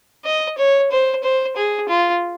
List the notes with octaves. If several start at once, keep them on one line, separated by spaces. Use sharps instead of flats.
D#5
C#5
C5
C5
G#4
F4